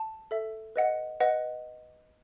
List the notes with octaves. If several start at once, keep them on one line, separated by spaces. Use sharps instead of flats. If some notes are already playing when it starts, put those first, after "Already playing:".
Already playing: A5
A4 E5
B4 D#5 F#5
B4 D#5 F#5